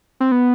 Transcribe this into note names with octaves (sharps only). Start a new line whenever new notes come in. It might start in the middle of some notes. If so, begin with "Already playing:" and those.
C4
B3